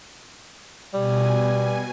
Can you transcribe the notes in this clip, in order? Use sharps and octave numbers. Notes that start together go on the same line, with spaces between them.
B2 G3 G#5